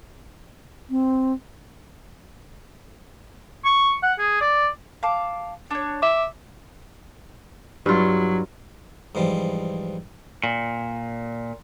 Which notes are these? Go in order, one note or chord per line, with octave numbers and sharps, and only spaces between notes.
C4
C#6
F#5
G#4
D5
F5 A5 D6
D4 C#5
E5 D6
G2 F#3 E4 F4
G#2 E3 F3 G3
A#2